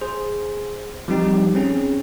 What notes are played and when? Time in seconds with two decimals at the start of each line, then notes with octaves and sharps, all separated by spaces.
0.01 G#4 C5
1.08 F3 G3 C4 D#4 G4
1.55 C4 C#4 G#4